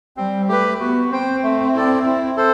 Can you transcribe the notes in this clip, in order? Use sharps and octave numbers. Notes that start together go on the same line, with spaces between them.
G3 C4
A3 G4 B4
B3 F#4
C4 C5 G5
A3
E4 A4 D5
E4
A4 C5